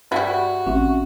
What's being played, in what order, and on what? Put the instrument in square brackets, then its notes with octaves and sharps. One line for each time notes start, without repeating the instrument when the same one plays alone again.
[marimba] G2 [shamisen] G3 E4 [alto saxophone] F#4
[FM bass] A1 [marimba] C4 C#4 E5